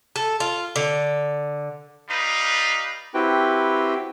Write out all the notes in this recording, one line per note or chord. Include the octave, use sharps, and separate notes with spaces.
A4
F4
D3
G3 D#4 B4 F5
C4 E4 F#4 G4 B4 G5